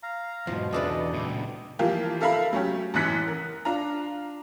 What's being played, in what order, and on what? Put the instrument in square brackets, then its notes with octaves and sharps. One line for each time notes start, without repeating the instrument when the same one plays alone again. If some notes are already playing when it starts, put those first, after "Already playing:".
[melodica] F5 A#5
[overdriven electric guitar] E2 G#2 [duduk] B2 [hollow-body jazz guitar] F3
[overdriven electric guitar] E2 [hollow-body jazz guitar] C#3 D4 B4 [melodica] A4 D5 D#5
[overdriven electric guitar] C#2 A#2
[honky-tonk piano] E3 F3 A#3 F4 G4 A#4
A4 A#4 E5 F5 A#5 B5
F#3 A3 C#4 G4
A1 F#2 E3 F#6 B6 C#7
A#4
D4 F4 A#5